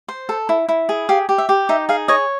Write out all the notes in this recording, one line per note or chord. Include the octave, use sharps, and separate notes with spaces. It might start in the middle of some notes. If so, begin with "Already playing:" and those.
C5
A4
E4
E4
G#4
G4 F5
G4
E5
G4
D#4 E5
G#4 F5
C#5 D#5